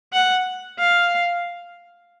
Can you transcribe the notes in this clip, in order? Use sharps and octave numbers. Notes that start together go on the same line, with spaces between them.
F#5
F5